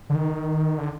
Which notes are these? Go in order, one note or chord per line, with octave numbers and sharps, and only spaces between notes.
D3
D#3
D3